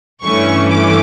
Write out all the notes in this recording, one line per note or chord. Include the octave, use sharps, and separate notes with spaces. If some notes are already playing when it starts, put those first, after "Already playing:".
G2 E3 A3 C#4 C#6
D6